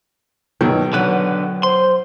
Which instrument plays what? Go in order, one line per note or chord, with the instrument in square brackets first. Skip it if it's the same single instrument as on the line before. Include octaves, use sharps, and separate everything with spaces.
[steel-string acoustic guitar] G2 F#3 [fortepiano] B2 D#3
[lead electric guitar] D3 B4 [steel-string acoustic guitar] F#3 F#5
[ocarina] C5 [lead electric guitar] C6